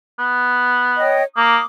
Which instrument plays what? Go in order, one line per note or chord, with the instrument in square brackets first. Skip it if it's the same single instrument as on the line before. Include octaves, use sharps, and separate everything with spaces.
[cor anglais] B3
[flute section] C#5 D#5 G5
[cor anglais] A#3 [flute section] D6 D#6